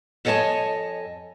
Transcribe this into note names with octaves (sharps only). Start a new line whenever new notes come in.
F2 A4 C#5 D#5 G#5 A5